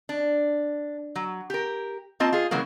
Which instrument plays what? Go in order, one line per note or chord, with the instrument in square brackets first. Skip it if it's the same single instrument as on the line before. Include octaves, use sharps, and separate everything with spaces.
[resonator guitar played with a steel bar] D4
F#3
G4 A#4
A#3 C4 F4 D#5 A5
F4 G#4
C#3 E3 F#3 G#3 A#3